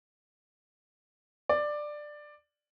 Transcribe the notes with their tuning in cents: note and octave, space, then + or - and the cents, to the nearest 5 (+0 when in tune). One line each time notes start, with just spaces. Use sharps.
D5 +10